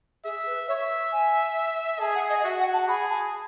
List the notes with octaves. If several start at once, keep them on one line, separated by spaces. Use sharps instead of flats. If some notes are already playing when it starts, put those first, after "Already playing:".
G#4 E5
B4
C#5 E5
G#5
G#4 A5
F#5
D#5
F#4 E5
F#5
A5
G#4 B5
A5